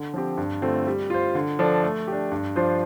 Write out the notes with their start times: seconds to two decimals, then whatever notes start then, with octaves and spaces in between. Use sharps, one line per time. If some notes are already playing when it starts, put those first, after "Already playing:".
Already playing: D3
0.14 F3 C4 G4
0.38 G2
0.62 D3 A3 C4 F4
0.87 G3
1.10 F4 C5
1.35 D3
1.59 F3 D4 A4
1.83 A3
2.08 D4 G4
2.32 G2
2.56 F3 D4 F4 C5